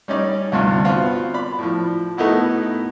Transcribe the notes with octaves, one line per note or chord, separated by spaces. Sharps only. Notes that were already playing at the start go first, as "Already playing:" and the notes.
G3 C#4 D#4 D5
D2 G2 C3 F4
B3 C4 F4 F#4
D5 B5
A2 F3
A2 A3 B3 D#4 E4 F#4